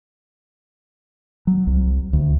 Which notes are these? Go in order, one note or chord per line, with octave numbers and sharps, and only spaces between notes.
F#3
C2
D2